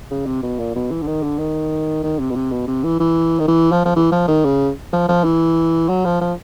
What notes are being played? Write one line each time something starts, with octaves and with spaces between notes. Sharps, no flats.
C#3
C3
B2
A#2
B2
E3
D3
D#3
D3
D#3
D#3
C3
B2
C3
B2
C3
E3
E3
D#3
E3
F3
F3
E3
F3
D#3
C#3
F3
F3
E3
F#3
F3
F3